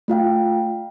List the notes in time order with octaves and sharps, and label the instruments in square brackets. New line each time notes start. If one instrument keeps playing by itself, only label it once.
[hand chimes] A3 F4 F5 G5